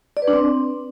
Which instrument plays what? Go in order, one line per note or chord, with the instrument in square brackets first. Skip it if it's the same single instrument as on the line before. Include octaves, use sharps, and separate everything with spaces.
[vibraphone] D5
B4
D4
C4